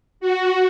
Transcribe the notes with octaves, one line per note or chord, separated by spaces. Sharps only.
F#4